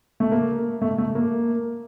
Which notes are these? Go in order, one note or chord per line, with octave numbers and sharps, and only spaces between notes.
A3
A#3
A3
A3
A#3